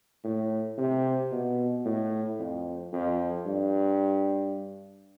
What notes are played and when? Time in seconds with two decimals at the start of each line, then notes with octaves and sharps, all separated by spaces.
0.24 A2
0.78 C3
1.32 B2
1.85 A2
2.39 F2
2.93 F2
3.46 G2